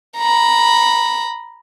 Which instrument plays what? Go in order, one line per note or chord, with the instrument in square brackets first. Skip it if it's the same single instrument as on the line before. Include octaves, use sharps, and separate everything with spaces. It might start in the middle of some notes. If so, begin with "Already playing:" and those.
[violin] A#5 B5